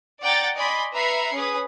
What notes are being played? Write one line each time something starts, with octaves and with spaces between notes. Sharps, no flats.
D5 F#5 G5 A#5 A6
D5 D#5 G#5 B5 C6
B4 E5 A#5 B5 C7 C#7
C#4 G#4 B4 D#6